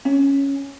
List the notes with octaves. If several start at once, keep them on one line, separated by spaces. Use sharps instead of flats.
C#4